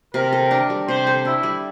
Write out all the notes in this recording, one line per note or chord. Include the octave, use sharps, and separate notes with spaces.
C3 A#4
A4
D4
G3
C3 C5
A4
D4 E4
G3